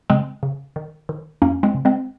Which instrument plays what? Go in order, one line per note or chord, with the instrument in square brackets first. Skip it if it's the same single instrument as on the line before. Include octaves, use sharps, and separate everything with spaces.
[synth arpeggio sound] C#3 G#3 C4
C#3
D#3
D#3
F2 A#3 C#4
G#3 C4
C#3
G#3 C4